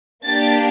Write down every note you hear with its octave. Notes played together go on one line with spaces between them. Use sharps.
A#3 D4 G4 A6